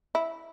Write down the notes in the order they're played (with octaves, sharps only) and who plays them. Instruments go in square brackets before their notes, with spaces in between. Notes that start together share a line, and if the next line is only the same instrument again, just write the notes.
[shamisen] E4